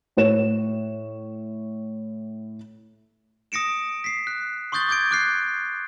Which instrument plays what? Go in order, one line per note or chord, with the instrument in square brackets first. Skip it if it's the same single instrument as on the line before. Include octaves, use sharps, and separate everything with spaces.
[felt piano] A2 C#5 E7
[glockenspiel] D#6 A#6 C#7 D7 E7
B6 C7
F#6
C6 C#6 D#6 G6 A6 G7
D6 G6 G#6 D7
D6 F#6 C7